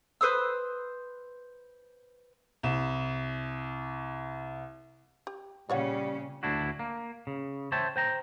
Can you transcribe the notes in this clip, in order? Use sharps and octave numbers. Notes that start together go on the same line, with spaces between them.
B4 C5 D#6 E6
C2 E7
G4
A#2 C#3 G3 C#4 F4 C#5 F#5
D2 D4 E4 F#4
A#3
C#3
C5 C#5 E5 G5 A5
C5 G5 A#5